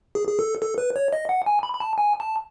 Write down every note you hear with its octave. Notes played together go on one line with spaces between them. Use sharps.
G#4
G#4
A4
A4
B4
C#5
D#5
F#5
G#5
B5
B5
A5
G#5
A5